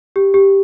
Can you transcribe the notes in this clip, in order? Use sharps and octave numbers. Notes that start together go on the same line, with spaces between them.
G4
G4